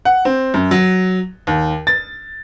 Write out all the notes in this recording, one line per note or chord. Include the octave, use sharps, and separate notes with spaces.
F#5
C4
F#2
F#3
D#2
A6